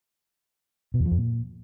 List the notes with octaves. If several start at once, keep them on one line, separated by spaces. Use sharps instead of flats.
B2
E2
F3
F2
A#2